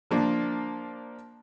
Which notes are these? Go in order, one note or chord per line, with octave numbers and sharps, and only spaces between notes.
F3 A#3 D4